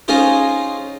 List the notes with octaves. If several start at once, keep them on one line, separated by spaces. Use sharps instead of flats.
C#4 D#4 F4 G#4 C5